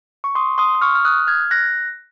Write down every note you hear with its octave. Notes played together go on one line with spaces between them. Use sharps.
C#6
C6 D#6
C6 D#6
D#6
C#6 F6
F6
D#6 F#6
F6 G#6
F#6 A#6